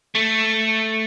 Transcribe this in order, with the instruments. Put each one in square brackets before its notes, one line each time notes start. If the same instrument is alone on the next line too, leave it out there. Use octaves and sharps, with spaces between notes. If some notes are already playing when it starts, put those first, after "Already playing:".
[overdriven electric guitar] A3